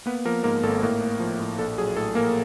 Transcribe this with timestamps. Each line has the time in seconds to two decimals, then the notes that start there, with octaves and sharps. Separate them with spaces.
0.06 A#3 B3 B4
0.25 F3 A#3 A#4
0.44 G#2 A#3 A#4
0.63 G#1 A4
0.83 A2 A#3 A#4
1.01 A3
1.20 F3
1.40 A2
1.59 A#1 A4
1.78 F#3 G#4
1.96 A2 A4
2.15 A#1 A#3 A#4